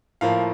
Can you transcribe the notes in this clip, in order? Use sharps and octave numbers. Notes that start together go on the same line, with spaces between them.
A2 F3 A#3 F5